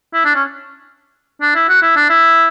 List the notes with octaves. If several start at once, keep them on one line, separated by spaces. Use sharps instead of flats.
E4
D4
C#4
D4
E4
F#4
E4
D4
E4